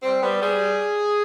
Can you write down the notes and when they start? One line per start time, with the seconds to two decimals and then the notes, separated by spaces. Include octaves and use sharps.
0.02 G3 C4
0.21 G3 B3
0.40 G3 G#4